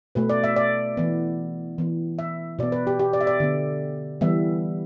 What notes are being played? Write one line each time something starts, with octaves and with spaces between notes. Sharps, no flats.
B2 A3 B4
D5
E5
D5
E3 B3
E3 B3
E5
B2 B3 D5
B4
G4
G4
D5
E5
D5
D3 B3
E3 G3 B3 E5